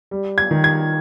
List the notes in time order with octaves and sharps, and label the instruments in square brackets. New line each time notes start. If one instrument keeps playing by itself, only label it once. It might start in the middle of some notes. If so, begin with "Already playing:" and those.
[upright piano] G3
G#6
D#3
G#6